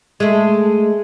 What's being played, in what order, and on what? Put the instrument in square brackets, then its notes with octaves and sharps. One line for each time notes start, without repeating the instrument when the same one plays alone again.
[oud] G#3 A3